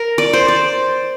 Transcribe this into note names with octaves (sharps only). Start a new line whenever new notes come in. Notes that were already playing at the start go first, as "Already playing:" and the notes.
Already playing: A#4
D5
C5
D5